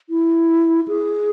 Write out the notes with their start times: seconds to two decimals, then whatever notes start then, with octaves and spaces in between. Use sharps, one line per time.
0.10 E4
0.88 G#4